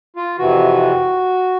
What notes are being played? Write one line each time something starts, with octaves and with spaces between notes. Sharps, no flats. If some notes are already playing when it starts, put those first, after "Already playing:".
F4
F2 C3 E3 F#4